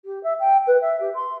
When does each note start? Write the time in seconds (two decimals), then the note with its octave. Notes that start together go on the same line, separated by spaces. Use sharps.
0.05 G4
0.23 E5
0.40 G5
0.67 B4
0.81 E5
1.00 G4
1.15 C6